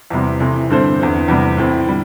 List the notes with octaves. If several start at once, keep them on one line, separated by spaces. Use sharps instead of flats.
E2 C3 G3
C3 E3 A3
G2 D3 C4 A4 C5
E2 D3 C4
E2 C3 G3
A2 E3 C4
D3 G3